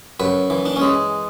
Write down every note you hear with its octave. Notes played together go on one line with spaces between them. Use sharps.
F#2 B4
E3
D4
C#4
G#3